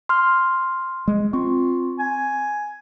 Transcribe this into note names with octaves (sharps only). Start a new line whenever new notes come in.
C6 F6
G#3
C4 F4 C#6
G#5